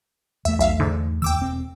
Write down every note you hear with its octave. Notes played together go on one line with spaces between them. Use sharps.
E2 A3 E5
B1 E5 F5
G#2 D3
D#2 D#3 G5 D6 E6
E1 C4